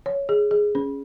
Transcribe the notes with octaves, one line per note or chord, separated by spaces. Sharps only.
C#5
G#4
G#4
C#4